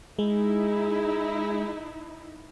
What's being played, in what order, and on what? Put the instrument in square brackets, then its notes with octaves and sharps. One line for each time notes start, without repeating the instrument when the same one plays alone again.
[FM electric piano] G#3 [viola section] D#4 E4 [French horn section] G#4